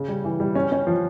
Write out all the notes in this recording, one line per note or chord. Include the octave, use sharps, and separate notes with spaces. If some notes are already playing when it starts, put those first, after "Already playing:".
Already playing: C#3
G3
E3
G3
C#4
C#4
F3